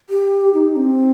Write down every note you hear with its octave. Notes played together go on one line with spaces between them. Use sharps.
G4
D#4
C4